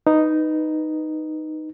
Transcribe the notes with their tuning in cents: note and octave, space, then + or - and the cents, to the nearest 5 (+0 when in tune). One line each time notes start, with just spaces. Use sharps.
D#4 -5 B4 +0